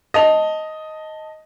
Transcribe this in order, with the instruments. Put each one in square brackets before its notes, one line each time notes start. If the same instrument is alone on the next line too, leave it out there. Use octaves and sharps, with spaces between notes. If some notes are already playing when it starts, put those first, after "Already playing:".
[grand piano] D#5 A5 F7